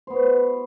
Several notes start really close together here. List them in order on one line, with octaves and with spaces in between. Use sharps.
C5 B3 F#4